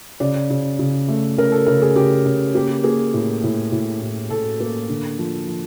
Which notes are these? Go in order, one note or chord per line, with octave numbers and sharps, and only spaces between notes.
C#3 D5
C#3
C#3
A3
C#3 A#4
A4
C#3 A#4
G#4
C#3 G4
C#3
A#3 G4
A#3 G#4
A2
A2
A2
A2
A2 A4
A#3
D3
F3
F3